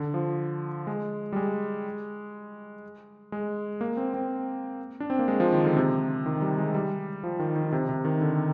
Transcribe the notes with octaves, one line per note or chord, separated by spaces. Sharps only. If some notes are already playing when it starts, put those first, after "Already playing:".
Already playing: D3
F3
G#3
G3
G#3
G#3
A#3
C4
C4
D4
C4
A#3
G#3
F3
D#3
D3
C3
D#3
G3
G#3
G3
F3
D#3
D#3
C3
C3
D#3
D3